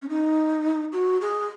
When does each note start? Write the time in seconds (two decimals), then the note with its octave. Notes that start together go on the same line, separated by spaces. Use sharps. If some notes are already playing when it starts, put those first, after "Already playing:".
0.02 C#4
0.09 D#4
0.92 F#4
1.21 G#4